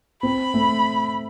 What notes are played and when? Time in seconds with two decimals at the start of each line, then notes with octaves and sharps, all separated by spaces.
0.23 C4 B5
0.54 A3